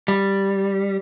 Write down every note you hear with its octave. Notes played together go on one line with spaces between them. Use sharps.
G3